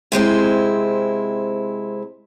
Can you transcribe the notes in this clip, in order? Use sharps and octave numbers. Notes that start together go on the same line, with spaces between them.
C3 G#3 C4 E4